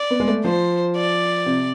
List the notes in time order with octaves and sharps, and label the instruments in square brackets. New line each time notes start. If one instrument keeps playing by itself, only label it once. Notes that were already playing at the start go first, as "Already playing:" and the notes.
Already playing: [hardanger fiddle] D5
[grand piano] B3
G#3
A3
[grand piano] F3 [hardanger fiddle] C5
[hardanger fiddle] D5
[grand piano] C3